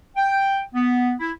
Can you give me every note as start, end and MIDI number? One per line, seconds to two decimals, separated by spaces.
0.17 0.61 79
0.74 1.14 59
1.19 1.31 64